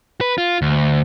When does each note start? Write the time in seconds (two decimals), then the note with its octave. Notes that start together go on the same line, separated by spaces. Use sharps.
0.21 B4
0.38 F4
0.62 D2